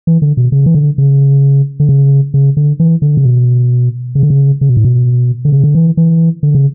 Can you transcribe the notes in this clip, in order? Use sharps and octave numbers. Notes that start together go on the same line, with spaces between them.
E3
D3
B2
C#3
E3
D3
C#3
D3
C#3
C#3
D3
E3
D3
C#3
B2
C#3
D3
C#3
C#3
B2
A2
B2
D3
C#3
D3
E3
E3
D3
C#3